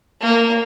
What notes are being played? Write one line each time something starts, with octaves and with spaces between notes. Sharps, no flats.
A#3